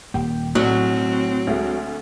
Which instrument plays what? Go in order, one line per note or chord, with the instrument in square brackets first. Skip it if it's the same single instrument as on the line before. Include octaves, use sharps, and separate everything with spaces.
[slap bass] D#1 A#3 [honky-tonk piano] G4
[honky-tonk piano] B1 [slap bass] A2 [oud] F#3 [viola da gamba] C4
[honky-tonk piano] D2 G#3 A3